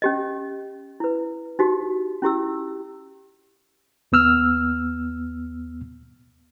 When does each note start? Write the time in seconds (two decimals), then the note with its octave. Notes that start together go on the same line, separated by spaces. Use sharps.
0.02 C#4 G4 D#5
1.00 E4 B4
1.59 D#4 F#4 G4
2.22 C#4 E4 G4 E6
4.12 D#2 B3 E6 F6